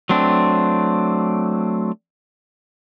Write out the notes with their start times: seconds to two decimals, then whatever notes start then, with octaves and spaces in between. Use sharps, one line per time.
0.09 F#3 A3 C4 D4